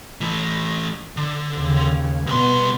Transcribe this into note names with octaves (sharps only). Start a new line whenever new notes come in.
E3 A3
D3
D#2 C#3
C2 B2 B3 C6